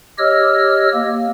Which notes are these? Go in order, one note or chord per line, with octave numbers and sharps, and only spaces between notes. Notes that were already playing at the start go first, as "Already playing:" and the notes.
G4 C#5 D#5 E6 F6
A#3